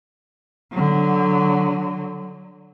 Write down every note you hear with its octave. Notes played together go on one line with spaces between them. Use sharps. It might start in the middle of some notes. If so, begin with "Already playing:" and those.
D3 F#3